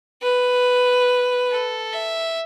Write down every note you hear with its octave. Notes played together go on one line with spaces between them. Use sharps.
B4
A4
E5